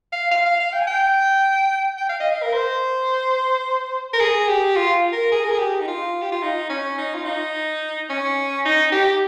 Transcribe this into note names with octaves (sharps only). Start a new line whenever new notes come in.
F5
F5
F5
F5
G5
G#5
G5
G5
F5
D#5
F5
A#4
C5
A#4
G#4
G4
F4
A#4
G#4
A#4
G#4
G4
D#4
F4
G4
F4
D#4
C#4
D#4
F4
D#4
C#4
D#4
G4